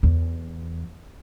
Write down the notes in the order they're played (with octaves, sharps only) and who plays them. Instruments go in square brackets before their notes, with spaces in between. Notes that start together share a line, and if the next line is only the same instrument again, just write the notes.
[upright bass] E2